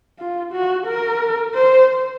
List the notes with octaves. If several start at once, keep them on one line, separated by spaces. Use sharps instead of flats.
F4
F#4
A#4
C5